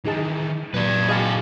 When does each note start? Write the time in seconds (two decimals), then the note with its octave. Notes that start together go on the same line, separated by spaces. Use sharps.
0.06 D#3 E3 D#4 G#4 A5
0.74 A#2 F#3 B4 D5
1.09 F#4 G#4 D#5 F5 A5